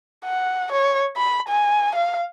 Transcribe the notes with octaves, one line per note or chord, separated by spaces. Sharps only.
F#5
C#5
B5
G#5
F5